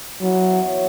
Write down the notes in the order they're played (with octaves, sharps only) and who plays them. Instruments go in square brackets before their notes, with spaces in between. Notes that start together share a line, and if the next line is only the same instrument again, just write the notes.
[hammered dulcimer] E3 B3 E4 [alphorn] F#3
[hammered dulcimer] F#2 E3 C#4 F#4